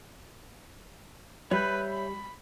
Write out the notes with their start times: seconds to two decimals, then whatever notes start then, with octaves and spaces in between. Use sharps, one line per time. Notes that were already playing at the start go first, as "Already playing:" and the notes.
1.51 G3 B4 C#5 E5 G6
1.90 B5